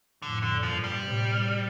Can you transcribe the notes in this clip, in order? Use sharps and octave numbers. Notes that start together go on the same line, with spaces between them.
F2 A2 D3
D3
G2 A#2 F3
G3
A2 C3